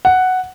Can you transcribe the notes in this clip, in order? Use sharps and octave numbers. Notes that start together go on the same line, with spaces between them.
F#5